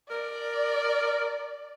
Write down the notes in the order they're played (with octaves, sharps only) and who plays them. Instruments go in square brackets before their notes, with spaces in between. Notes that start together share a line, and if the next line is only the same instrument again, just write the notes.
[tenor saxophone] A#4 [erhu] D5